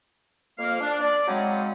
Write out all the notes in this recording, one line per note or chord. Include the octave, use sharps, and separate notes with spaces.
F2 A#3 F5
D4
D5
C#3 F#3 G#3 C4 C#4 D#4